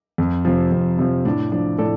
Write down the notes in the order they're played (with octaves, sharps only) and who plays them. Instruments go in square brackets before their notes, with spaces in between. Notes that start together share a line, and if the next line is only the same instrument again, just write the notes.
[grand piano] F2
C3 F3
F2
C3 F3
A2 D4
F3 D4
A2 A4 D5